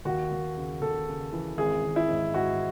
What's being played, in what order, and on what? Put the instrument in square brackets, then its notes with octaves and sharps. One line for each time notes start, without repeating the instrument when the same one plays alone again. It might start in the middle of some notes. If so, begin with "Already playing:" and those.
[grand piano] D#2 F#4
D#2
C#3
D#2 A4
C#3
E3
G#1 G#4
G#1
E4
G#2
G#2 F#4